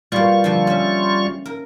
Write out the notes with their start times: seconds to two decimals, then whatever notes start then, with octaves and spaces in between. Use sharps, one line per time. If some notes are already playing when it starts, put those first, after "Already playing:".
0.12 B2 G3 A#3 F4 C#6
0.44 D3 F3
0.67 C#4 E5
1.46 A#4